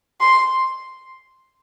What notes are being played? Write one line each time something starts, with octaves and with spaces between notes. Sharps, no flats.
C6